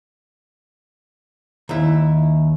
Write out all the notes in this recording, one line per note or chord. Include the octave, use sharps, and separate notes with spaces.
D#2 E4